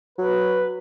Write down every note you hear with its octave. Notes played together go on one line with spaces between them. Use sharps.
F#3 B4